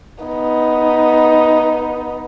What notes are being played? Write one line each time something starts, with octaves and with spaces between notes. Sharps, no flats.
B3 D#4